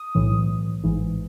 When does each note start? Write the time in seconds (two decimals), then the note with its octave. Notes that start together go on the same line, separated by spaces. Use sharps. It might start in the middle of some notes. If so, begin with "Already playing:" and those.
Already playing: D#6
0.15 B1 A2 E3
0.84 A1 G#2 E3